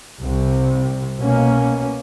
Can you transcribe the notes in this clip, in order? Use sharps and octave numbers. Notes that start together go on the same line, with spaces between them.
C2 C3
B2 A#3 C#4